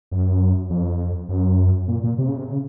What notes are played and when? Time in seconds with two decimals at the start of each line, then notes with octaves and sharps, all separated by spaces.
0.11 F#2
0.70 F2
1.29 F#2
1.88 A#2
2.04 A#2
2.18 C3
2.28 C#3
2.37 C3
2.48 C#3